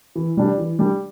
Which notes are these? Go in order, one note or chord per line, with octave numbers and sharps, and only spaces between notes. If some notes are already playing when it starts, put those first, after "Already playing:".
E3
G3 D4 G4
E3
G3 D4 G4